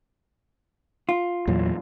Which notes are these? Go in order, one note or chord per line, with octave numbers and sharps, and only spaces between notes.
F4
E2 A#2 F#3